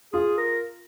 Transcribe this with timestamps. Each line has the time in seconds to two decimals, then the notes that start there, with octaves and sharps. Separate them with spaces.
0.13 F4 G#4
0.38 A#4